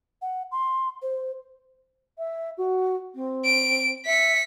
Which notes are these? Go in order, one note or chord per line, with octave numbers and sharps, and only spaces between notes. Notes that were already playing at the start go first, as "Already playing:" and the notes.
F#5
C6
C5
E5
F#4
C4
D7
E5 B6 C#7